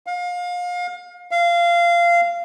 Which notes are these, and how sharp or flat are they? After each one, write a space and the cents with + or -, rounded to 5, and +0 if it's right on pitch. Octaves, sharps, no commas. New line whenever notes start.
F5 +30
F5 -20